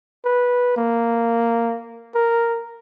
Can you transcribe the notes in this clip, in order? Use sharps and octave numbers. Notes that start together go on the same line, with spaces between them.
B4
A#3
A#4